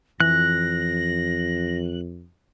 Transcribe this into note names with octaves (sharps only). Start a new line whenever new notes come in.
F2 E3 F#6 A#6